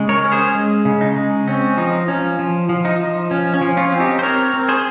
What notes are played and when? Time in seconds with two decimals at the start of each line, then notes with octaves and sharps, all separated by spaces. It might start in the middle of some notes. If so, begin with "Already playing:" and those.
Already playing: C#3 G#3
0.09 A#4 C#5
0.24 C#4
0.32 G#4 C5
0.55 G#3
0.85 C#3
1.01 D#4
1.16 G#3
1.47 C4 C#4
1.77 F3 D#4
2.08 F3 C#4
2.39 F3
2.69 F3
2.85 D#4
3.00 F3
3.31 F3 C#4
3.54 C#4
3.61 F3
3.77 C#4 F4
3.92 C4
4.00 D#4 G4
4.19 C5
4.23 C4 A#4 C#5
4.54 C4
4.69 G#4 C5